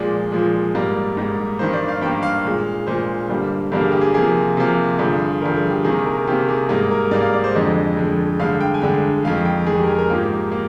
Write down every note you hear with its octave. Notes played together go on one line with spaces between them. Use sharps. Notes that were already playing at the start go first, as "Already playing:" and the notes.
Already playing: A#2 F3 G#3 D5
A#2 F3 G#3
G#2 G3 A#3
G#2 G3 A#3
G2 D#3 A#3 C5
D5
F5
G2 D#3 A#3 G5
F5
A#2 G#3
A#2 G#3 C5
G2 D3 G3 A#3
G2 D3 G3 A#3 A#4
G#4
G4
G#4
C3 F3 A#3 G#4
C3 F3 A#3
G2 D3 F3 G#4
G2 D3 F3 A#4
G#4
G4
C3 D#3 A#3 G#4
A#4
C3 D#3 A#3 G4
G#4
G#2 G3 A#3 G#4
A#4
G#2 G3 A#3 D5
F5
D5
C5
F2 D3 G#3 D#5
F2 D3 G#3
G2 D3 G#3 F5
G5
G#5
G2 D3 G#3 G5
F2 D#3 G#3 F5
G5
F2 D#3 G#3 G#4
G4
A#4
G#4
A#4
G#2 F3 A#3 G4
A#3